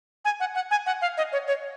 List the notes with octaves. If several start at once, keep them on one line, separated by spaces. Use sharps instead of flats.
G#5
F#5
F#5
G#5
F#5
F5
D#5
C#5
C#5